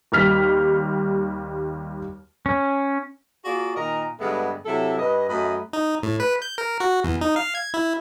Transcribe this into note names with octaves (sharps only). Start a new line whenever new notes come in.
D#2 G3 F6 B6
C#4
A#3 F4 F#4 G#4 D5
A#2 D#3 A#4 D#5 A#5
G2 D3 G#3 A3 B3
C3 F#3 E4 A4
G2 B4 D#5
F#2 A3 D#5 B5
D#4
A2
B4
G6
A#4
F#4
E2
D#4
F5
G#6
E4